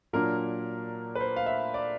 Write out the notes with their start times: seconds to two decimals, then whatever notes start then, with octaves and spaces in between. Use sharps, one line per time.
0.13 A#2 F#3 A#3 D4 A#4
1.15 B4
1.20 C5
1.36 F5
1.46 E5
1.74 D5